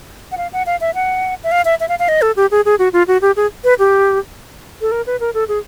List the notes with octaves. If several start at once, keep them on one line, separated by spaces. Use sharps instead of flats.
F#5
F5
F#5
F5
E5
F#5
E5
F5
E5
E5
F5
F5
D#5
A4
G4
G#4
G#4
F#4
F4
F#4
G4
G#4
B4
G4
A4
A#4
B4
A#4
A4
G#4